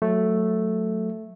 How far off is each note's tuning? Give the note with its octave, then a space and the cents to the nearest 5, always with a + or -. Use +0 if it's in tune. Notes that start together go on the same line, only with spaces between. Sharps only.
F#3 -15 A3 +0